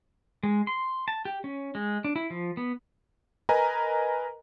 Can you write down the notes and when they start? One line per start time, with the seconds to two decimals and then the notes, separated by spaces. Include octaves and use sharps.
0.43 G#3
0.67 C6
1.08 A5
1.25 G4
1.44 C#4
1.75 G#3
2.04 D4
2.16 E4
2.30 F3
2.57 B3
3.49 A#4 B4 D#5 G#5 A#5